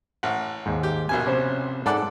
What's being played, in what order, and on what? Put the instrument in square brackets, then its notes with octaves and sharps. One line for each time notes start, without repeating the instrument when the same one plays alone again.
[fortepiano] A1 [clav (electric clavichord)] F#5
[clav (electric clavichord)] D#2 G#2
[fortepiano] G4
A#1 B2 G#5
[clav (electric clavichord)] C3 C#4 C5
[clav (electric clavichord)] G#2 [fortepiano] A4 D5 F#5